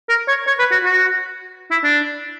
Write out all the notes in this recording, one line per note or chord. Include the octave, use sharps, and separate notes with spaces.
A#4
C#5
C#5
B4
F#4
F#4
E4
D4